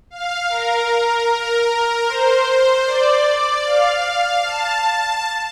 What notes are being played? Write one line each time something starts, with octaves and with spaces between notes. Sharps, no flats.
F5
A#4
A#4
C5
D5
F5
A5